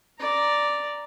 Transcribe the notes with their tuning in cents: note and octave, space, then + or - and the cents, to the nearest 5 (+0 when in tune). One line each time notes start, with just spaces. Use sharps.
D5 +0 A#5 +0